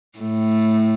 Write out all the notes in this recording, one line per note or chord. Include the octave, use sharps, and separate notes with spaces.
A2 A3